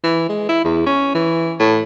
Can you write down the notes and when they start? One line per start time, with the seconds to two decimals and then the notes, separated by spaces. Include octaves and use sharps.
0.04 E3
0.29 G#3
0.49 E4
0.65 E2
0.86 C#4
1.15 E3
1.60 A2